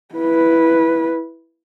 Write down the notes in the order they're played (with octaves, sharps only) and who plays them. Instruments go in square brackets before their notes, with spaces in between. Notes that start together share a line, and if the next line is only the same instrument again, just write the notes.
[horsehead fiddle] E4 B4